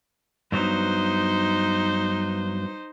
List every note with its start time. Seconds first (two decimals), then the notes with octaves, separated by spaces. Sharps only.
0.52 G2 F#3 B3 D#4 C5